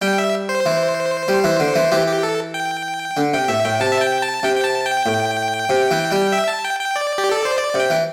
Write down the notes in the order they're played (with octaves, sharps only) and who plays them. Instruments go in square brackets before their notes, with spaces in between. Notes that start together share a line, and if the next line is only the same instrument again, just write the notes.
[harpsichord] G3 [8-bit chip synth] G5
[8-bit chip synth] E5
C5
[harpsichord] E3
G3
E3
D3
E3
[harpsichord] E3 [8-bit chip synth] G4
[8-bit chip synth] G4
A4
G5
[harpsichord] D3
[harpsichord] C3 [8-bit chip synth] G5
[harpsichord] A2 [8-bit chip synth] E5
[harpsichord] A2 [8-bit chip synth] G5
[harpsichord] C3 [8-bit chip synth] A5
[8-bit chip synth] E5
G5
A5
[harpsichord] C3 [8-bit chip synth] G5
[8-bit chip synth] G5
A5
G5
[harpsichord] A2
C3
E3
G3
[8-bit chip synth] E5
A5
G5
G5
D5
G4
A4
C5
D5
[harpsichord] C3
[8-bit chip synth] G5
[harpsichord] E3